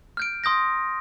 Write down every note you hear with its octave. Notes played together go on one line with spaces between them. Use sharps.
F6 G6 D7
C6 D#6 G6 A#6